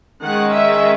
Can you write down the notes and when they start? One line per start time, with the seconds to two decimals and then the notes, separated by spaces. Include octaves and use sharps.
0.23 D#3 G#3 C#4 F#5
0.53 E5